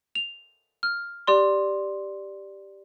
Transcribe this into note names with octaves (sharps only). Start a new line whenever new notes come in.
F7
F6
G4 D5 C6